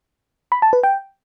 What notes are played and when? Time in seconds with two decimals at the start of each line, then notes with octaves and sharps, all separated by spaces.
0.52 B5
0.62 A5
0.73 B4
0.83 G5